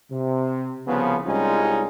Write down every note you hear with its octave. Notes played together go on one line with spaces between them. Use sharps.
C3
C2 C#3 F3 B3
C2 G3 G#3 C#4 D#4 F4